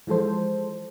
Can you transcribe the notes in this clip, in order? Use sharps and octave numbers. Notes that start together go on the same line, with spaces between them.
E3 F3 G#3 A4 C5